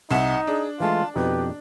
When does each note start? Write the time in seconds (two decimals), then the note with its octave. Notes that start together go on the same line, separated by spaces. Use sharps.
0.11 C2 D#4 E5 F#5 E7
0.47 D4 G#4
0.80 E3 G#3 A3 F4 A5
1.16 F2 B2 D#4 G4 B4